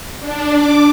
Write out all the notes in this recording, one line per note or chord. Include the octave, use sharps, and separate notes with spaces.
D4
D6